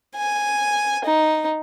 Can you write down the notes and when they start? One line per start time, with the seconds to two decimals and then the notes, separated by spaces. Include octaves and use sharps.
0.16 G#5
1.05 D#4